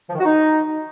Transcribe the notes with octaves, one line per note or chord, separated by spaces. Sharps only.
F3
D#3
F#4
D#4